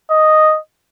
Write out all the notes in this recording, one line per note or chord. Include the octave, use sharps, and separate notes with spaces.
D#5